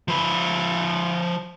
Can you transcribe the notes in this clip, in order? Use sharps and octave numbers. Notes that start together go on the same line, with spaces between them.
F3 B4